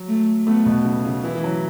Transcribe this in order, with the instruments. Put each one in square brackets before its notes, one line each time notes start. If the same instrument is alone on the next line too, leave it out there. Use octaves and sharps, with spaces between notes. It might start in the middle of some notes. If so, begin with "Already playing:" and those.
Already playing: [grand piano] F#3
[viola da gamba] A3
[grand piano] A3 [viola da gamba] B3
[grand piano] B2
C#3
C#3
[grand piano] E3 [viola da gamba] E4
[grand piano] E3
F#3